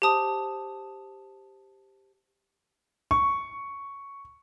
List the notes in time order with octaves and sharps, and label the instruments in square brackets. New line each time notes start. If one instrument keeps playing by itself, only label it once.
[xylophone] G4 C5 A5 D#6
[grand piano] C#6